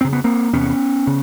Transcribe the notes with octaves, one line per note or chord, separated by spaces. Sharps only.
F2 C#3 C4
B3
A#3 C4
E2 C3 B3 C#4
C#3